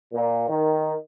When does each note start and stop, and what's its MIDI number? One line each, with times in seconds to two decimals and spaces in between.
0.13 0.47 46
0.48 0.94 51